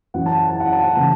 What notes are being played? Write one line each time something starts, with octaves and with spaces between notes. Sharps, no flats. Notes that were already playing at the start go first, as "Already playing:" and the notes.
F#2 E3 C#4 F#5
A5
F#5
A5
F#5
A5
F#5
C#3 E3 A5